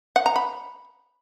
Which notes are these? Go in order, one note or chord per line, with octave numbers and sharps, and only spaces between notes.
F#5
A#5
B5